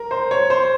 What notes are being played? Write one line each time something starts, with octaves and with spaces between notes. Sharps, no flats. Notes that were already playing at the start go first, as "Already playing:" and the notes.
Already playing: A#4
C5
C#5
C5